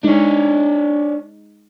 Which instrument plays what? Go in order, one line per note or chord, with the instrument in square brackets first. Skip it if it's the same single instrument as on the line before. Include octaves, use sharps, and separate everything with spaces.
[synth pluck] G#3 D#4 [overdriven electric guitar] D4 C#5